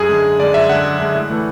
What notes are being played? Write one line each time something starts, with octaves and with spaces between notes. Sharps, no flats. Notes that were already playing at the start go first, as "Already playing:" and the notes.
Already playing: F#2 G#4
D3 G#3
F#2
D3 G#3 D5
F#2 E5
D3 G#3 F#5
F#2
D3 G#3
A2
E3 A3